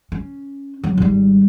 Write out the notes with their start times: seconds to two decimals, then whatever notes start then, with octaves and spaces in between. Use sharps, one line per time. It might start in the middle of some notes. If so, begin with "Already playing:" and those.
0.12 C#4
0.84 F#3 C4
0.98 G#1 G3